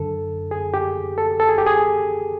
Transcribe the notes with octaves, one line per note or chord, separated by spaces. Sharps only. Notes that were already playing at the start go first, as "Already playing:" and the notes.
Already playing: F#2 D3 A4
G#4
G4
A4
A4
G#4
G4
G#4